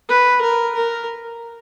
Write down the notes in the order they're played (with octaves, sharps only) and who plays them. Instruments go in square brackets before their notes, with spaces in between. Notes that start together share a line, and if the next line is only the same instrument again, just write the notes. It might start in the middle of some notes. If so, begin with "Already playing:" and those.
[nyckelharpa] B4
A#4
A#4